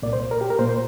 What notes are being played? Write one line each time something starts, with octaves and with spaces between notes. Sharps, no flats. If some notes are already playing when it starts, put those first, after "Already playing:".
C2 A#2 A#3 D5
C5
A#4
G4
A#4
A#2 A#3 C5
C5